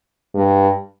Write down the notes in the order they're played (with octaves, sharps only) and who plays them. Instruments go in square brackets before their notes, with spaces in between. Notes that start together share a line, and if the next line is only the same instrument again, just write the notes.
[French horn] G2